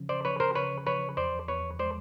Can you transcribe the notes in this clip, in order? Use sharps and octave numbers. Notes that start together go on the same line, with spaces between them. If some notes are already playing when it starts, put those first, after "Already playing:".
Already playing: C#3 F3 C#4
C5 D5
F3 B4 C#5
A#4 C5
C#3 B4 C#5
F3 B4 C#5
E2 C5 D5
E2 B4 C#5
G#3 C5 D5